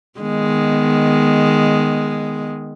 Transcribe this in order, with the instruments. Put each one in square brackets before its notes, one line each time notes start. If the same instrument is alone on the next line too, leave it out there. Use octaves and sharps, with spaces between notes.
[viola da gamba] D#3 G#3 B3